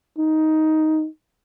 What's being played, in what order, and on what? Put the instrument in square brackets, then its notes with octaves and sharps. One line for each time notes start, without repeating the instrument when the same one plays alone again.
[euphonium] D#4